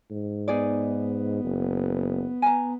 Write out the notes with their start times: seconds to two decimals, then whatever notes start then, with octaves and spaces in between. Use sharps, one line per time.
0.11 G#2
0.48 B3 D#4 G#4 D5
1.44 F#1
2.42 G#5 A#5